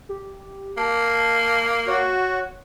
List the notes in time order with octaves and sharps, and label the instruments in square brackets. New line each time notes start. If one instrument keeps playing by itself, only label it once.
[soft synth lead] G4
[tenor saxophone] A#3 [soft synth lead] A5
[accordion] F#4 [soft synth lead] C#5